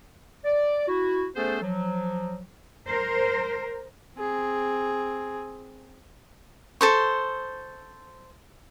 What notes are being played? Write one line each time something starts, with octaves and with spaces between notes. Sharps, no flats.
D5
E4 F#4
A3 B3 C#4 G#4 A4 C5
F3 F#3
A#4 C5
C4 G#4
A4 C5 C#6